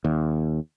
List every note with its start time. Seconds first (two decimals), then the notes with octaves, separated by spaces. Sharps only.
0.05 D#2